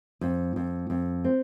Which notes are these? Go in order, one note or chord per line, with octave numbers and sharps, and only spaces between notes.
F2
F2
F2
C4